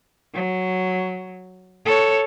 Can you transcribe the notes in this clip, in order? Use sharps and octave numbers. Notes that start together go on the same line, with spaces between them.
F#3
A4 C#5